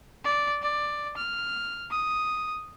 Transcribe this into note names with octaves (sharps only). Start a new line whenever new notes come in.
D5
D5
F6
D#6